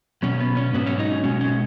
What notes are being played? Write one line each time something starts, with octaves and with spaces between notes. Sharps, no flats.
B2 F#3 C#4
B3
C#4
G#2 F#3 B3
C#4
D#4
C#4
B2 G#3 C#4
C#4